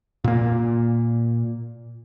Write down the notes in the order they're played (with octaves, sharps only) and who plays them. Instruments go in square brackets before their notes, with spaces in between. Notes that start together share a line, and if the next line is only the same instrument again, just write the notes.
[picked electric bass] A#2 A#3